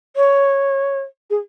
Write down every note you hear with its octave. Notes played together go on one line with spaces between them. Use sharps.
C#5
G#4